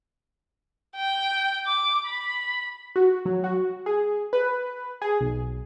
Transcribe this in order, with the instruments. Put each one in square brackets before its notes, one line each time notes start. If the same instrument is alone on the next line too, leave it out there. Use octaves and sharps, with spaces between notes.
[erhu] G5
D6
B5
[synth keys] F#4
F#3
F#4
G#4
B4
G#4
B1